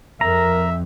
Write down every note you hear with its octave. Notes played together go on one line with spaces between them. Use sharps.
F2 A#4 E5 A#5